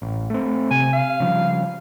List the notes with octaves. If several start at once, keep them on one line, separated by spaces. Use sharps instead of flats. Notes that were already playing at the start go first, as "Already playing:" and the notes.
A1
A3 C4
C3 G#5
F5
C#3 F3 G3